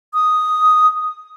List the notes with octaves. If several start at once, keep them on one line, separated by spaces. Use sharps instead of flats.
D#6